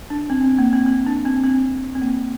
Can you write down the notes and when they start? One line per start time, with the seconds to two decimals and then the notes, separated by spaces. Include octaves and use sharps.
0.10 D4
0.30 C4
0.44 C4
0.59 A#3
0.73 C4
0.86 C4
1.06 D4
1.25 C4
1.44 C4
1.95 C4
2.01 A#3